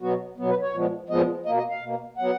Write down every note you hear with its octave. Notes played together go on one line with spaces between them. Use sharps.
B2 F#3 B3 F#4
B2 F#3 B3
B4
C#5
A#2 F3 G#3 B3
A#2 F3 G#3 B3 D#5
B2 A#3 D#5
D#5
F5
B2 A#3
F#3 B3 F#5